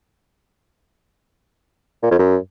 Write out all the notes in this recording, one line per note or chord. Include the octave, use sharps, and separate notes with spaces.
A#2
F2
F#2